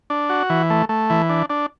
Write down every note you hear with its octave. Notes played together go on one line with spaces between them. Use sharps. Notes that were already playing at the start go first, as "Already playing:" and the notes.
D4
F#4
E3
A3
A3
E3
D4
D4